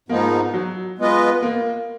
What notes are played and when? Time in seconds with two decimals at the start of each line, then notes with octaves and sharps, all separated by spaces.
0.09 G#2 F3 A#3 B3 D#4
0.54 F#3
0.99 G#3 B3 F4 B4 D#5
1.42 A#3